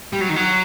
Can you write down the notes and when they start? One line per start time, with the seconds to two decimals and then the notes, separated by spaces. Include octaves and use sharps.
0.13 G3
0.20 F#3
0.29 D#3
0.36 F#3